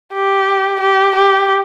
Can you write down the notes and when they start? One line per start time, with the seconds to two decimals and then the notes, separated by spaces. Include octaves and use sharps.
0.14 G4
0.81 G4
1.16 G4